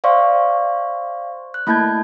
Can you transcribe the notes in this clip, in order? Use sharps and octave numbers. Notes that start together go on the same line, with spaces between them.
C5 D5 E5 F5 C6 C#6
F#6
A3 A#3 E4 A5 G6 G#6